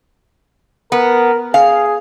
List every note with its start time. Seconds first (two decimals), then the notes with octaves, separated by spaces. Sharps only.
0.92 B3 A#4
1.54 G#4 F5